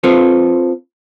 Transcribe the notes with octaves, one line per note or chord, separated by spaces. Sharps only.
C4 F4 A4 B4 C5